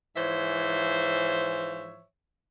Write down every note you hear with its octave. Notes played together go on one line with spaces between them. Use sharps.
G#2 E3 F3 C5 C#5 E5